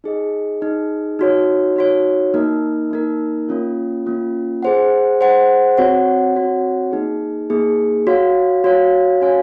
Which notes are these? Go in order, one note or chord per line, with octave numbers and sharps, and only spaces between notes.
D#4 G#4 D#5
D#4 G#4 D#5
D#4 F#4 C#5
D#4 F#4 C#5
A#3 D#4 A#4
A#3 D#4 A#4
A#3 C#4 F4
A#3 C#4 F4
G#4 C5 F#5
G#4 C5 F#5
C4 F#4 C#5 F#5
C4 F#4 C#5 F#5
A#3 D#4 G#4
A#3 D#4 G#4
F#4 C#5 F5
F#4 C#5 F5
C#4 F#4 C#5 F5 G#5